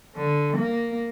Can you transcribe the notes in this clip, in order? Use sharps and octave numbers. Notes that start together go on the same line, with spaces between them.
D3
A#3